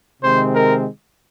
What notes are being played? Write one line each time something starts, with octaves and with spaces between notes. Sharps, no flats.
C3 D#3 G#3 C4 C5
A#4